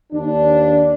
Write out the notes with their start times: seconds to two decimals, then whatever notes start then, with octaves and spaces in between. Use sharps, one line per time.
0.12 D#2 D4